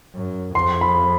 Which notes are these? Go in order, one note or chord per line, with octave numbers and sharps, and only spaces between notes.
F#2
F2 C6
B5